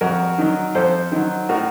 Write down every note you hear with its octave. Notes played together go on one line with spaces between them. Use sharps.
F2 F#4 A#4
D#3 F#3
F2 A4 C5
D#3 F#3
A2 F#4 A#4